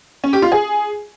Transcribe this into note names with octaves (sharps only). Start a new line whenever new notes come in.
C#4
G4
F4
G#4